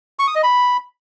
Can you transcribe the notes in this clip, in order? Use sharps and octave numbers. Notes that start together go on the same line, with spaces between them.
C#6
D#6
D#5
B5